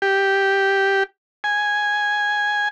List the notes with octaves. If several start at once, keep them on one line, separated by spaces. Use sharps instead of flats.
G4
G#5